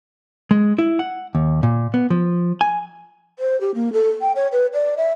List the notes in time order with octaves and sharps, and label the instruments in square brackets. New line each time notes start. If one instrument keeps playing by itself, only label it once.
[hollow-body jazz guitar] G#3
E4
F#5
D#2
A#2
B3
F3
G#5
[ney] C5
G4
A#3
A4
G5
C#5
B4
D5
E5